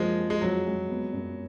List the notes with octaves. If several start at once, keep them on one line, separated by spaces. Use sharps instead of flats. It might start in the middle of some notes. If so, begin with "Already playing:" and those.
Already playing: F#2 F3 G#3 A#3
G#4
G#3
F2 F#3
G#3
B3
F#2